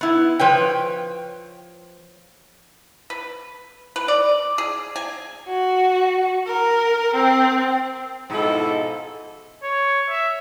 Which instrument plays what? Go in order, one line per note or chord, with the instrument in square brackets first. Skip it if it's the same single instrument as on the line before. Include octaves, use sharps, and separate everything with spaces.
[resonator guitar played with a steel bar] B3 E4
F3 B4 C#5 G5
[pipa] B4
B4
D5
G#4
G#5
[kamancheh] F#4
A#4
C4
[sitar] G#2 B2 [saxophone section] F3 E4 A4
[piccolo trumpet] C#5
E5